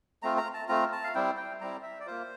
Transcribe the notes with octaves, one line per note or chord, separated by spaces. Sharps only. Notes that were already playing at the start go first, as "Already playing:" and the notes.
A3 C4 F4 A#5
A#5
A5
A3 C4 F4 A#5
A5
F5
G3 C4 E4 G5
G5
G3 C4 E4 A#5
E5
D5
A#3 F4 C5